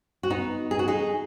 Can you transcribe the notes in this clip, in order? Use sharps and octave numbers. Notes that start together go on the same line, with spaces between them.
F#4
B3 D#4
G#4
F#4
D#4 G#4